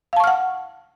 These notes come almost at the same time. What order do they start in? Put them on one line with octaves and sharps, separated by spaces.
F5 A5 C#6 F6 F#5